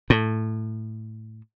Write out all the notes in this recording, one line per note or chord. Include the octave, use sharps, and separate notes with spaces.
A2